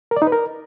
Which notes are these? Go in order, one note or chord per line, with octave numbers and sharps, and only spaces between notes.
A#4
D5
D#4
B4
A#4